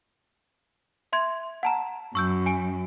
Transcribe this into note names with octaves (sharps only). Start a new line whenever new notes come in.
E5 C6 G#6
F#5 A5 A#5
F#2 C#6 E6 G6
G#5 D7